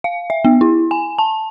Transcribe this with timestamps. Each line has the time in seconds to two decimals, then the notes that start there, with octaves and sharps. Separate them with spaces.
0.04 F5
0.30 E5
0.45 B3
0.61 E4
0.91 G#5
1.19 A5